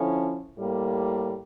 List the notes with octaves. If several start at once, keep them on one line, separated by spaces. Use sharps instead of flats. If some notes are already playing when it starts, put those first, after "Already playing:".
Already playing: D3 F3 C#4 E4
A2 G3 A#3